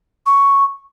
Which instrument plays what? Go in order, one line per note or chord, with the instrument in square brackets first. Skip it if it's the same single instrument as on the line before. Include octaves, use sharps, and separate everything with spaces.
[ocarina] C#6